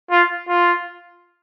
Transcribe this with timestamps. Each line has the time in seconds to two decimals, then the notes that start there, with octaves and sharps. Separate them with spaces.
0.11 F4
0.48 F4